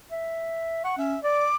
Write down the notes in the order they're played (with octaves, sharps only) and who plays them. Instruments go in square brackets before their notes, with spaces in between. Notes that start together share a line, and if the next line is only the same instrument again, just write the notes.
[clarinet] E5
[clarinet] F#5 [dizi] C#6
[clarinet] C#4 [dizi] E5
[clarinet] D5 [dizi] D6